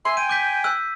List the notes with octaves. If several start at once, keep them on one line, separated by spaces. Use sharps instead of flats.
E5 G#5 C6
G5 G#5 D#7
D6 G6 B6
E6 F#6